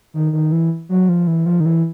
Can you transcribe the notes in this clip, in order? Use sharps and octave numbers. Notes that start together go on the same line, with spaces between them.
D#3
D#3
E3
F#3
F3
E3
F3
D#3
E3